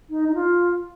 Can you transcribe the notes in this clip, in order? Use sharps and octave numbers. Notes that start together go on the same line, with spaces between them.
D#4
D#4
F4